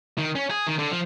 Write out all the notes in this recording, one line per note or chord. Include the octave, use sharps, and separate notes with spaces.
D#3
C#4
G#4
D#3
D3
F3